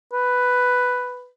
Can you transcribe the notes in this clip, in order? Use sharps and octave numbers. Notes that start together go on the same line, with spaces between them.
B4